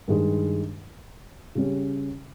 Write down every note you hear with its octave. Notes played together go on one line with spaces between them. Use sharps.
G2 D#3 G#3
C#3 G3 C#4